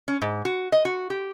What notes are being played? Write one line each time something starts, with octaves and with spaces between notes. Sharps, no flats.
C#4
G#2
F#4
D#5
F#4
G4